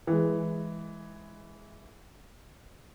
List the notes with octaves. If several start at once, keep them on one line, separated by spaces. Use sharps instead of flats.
E3 G#3